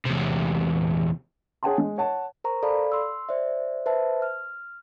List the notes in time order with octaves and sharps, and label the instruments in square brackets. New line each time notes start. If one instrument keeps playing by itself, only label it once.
[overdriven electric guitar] E2 C3
[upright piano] G#4 C#5 F#5 G5 A5 C6
G#3
C#5 F#5 A5
[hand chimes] A#4 C5 A#5 C#6
A4 D5 F5 A5 B5
C6 E6
C5 D5 E5
B4 C5 E5 A5
F6